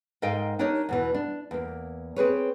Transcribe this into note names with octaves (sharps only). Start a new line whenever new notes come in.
G#2 A#4 D#5 F5 G5
D4 D#4 G4 A#4 C#5 D#5
E2 B2 E3
D4
E2 A#3
C4 G#4 B4 C#5